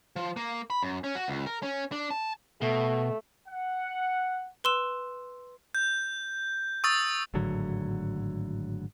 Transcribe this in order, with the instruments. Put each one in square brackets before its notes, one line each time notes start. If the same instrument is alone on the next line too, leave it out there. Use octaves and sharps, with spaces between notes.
[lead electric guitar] F3
A#3
B5
F#2
C#4
F#4
C#2
A#4
C#4
D4
A5
[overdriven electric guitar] B2 [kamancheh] A3
[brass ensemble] F#5
[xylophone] B4 C6 E6 E7
[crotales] G6
C#6 D#6 E6 A6
[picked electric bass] G#1 A2 D3 F#3